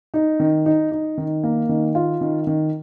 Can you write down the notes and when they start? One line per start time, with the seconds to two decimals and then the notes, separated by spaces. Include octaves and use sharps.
0.14 D#4
0.40 D#3
0.66 D#4
0.92 D#4
1.18 D#3
1.44 A#3
1.69 D#3
1.95 F4
2.21 D#3
2.47 D#3